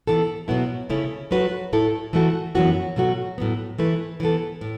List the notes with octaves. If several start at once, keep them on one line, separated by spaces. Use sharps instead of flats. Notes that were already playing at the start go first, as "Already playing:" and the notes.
E3 B3 A4
B2 F#3 B3 E4
C#3 A3 C#4 E4
F#3 A3 F#4 B4
A2 A3 E4 A4
E3 A3 F#4 A4
F#2 E3 B3 F#4
B2 F#3 A3 F#4
A2 F#3 B3
E3 A3 E4 B4
E3 B3 A4
A2